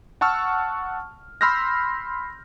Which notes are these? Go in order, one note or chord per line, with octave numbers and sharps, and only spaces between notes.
F#5 A5 C#6 E6 F6
B5 C6 E6 F6 G6 A#6